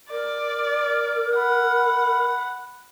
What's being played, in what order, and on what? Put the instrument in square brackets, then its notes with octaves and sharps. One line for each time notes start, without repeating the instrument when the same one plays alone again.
[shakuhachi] A#4 [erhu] D5
[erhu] F#5 [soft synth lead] B5